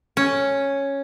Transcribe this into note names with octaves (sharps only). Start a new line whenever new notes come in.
C#4